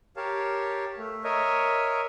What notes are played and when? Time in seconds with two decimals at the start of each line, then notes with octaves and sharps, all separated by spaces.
0.17 G4 A#4 C#5 F5 A5
0.98 A3
1.24 A#4 C#5 D#5 E5